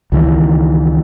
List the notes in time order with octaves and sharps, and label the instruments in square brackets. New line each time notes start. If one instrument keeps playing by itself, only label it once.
[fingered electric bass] C#2 D#3 E3